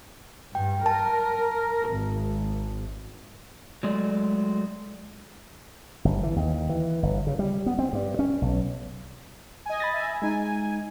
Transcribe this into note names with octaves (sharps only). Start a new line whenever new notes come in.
G2 G5
A#4 A5
G#1
F#3 G#3 A3 D5
G1
E3
D#2
E3
G1
C#3
G3
B3
C4
G2
C#4
B1
D#5 G#5
B5 A6 A#6
E5 G#5
G#3 D#4 G#5